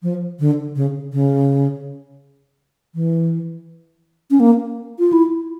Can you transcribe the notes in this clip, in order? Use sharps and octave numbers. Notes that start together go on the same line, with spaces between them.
F3
D3
C#3
C#3
E3
C#4
A#3
F4
E4